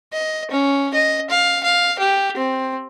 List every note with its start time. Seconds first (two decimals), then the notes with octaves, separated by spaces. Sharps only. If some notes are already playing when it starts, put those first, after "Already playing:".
0.13 D#5
0.51 C#4
0.94 D#5
1.30 F5
1.63 F5
1.99 G4
2.37 C4